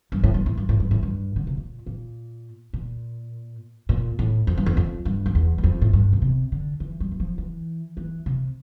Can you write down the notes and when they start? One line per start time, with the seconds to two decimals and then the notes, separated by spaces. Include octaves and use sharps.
0.12 G2
0.24 A2
0.34 G2
0.46 A2
0.58 G2
0.69 A2
0.80 G2
0.91 A2
1.03 G2
1.36 D3
1.47 C3
1.57 A#2
1.86 A#2
2.73 A#2
3.89 A#2
4.19 A2
4.47 F2
4.58 G2
4.66 F2
4.77 F2
5.05 G2
5.26 F2
5.35 E2
5.58 E2
5.64 F2
5.81 A2
5.93 G2
6.13 A#2
6.22 C3
6.52 D3
6.80 E3
7.00 G3
7.12 E3
7.20 F3
7.38 E3
7.97 E3
8.26 C3